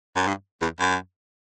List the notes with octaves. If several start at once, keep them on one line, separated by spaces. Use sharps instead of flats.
F#2
G2
E2
F#2